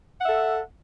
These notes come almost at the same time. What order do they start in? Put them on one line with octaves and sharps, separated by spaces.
F#5 E5 A4